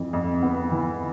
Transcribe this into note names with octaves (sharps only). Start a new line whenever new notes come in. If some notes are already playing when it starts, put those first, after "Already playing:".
Already playing: F2 E3
F2
B3
E3